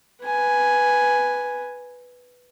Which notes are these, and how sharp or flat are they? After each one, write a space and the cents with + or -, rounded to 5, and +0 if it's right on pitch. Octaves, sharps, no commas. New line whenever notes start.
B4 +0 G#5 +0